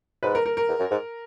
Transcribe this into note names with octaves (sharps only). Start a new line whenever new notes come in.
G#2 B4
A#4
A#4
A#4
E2
F#2
G#2